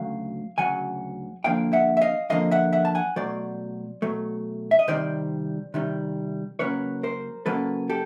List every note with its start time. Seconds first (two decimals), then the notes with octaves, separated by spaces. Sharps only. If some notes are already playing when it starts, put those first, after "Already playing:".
Already playing: D2 C#3 F#3 A3 F5
0.58 D2 C#3 F#3 F#5 G#5
1.44 F2 D3 F3 A#3 F5 G5
1.73 E5 F#5
1.97 E5
2.01 D#5 F5
2.30 F2 D3 F3 A#3 D#5 F5
2.51 E5 F#5
2.73 E5 F#5
2.85 A5
2.95 F#5 G#5
3.16 B2 F#3 A3 C5 D5
4.02 B2 F#3 A3
4.71 E5
4.79 D#5
4.88 C3 D#3 G3 C5 D5
5.74 C3 D#3 G3
6.59 C#3 F#3 A#3 C#4 B4 C#5
7.03 A#4 C5
7.46 C#3 F#3 A#3 C#4 A4 B4
7.90 G4 A4